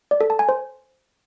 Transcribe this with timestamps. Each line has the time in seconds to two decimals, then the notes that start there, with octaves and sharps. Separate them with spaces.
0.11 D5
0.21 A4
0.30 A5
0.39 G#5
0.49 C5